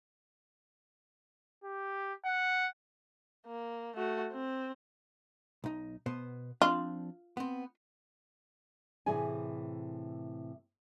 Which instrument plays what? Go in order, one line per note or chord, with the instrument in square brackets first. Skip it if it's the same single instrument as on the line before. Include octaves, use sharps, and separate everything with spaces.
[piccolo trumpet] G4
F#5
[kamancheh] A#3
A3 F#4
C4
[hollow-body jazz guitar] B1 D#4
B2 B3 C5
[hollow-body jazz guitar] F3 C4 D4 [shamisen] F4
[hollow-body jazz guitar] B3 C4
[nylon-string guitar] A2 C3 E3 G#4 G#5